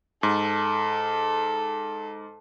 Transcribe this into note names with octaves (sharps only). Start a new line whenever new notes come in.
G#2 A4